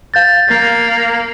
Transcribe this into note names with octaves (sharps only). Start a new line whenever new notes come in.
F5 G6 A6
A#3